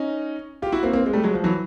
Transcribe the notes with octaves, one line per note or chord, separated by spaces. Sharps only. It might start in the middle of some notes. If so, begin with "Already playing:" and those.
Already playing: C#4 D#4
F4 G4
E4 F#4
A#3 C4
A#3 C4
G#3
G3 A3
F#3 G#3
F3
E3 F#3